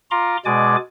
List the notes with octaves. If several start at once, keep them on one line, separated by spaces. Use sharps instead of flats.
F4 A#5 C6 D6
B2 G#3 D5 G#5 D6